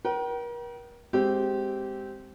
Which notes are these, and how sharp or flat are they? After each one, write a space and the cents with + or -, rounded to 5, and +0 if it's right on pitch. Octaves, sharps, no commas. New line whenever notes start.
A#4 +40 G5 -35
G#3 +0 C4 +0 G4 -20